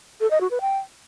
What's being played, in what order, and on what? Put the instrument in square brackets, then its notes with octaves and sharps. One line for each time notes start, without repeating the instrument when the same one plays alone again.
[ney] A4
D#5
F#4
B4
G5